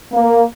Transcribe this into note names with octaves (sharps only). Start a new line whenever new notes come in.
A#3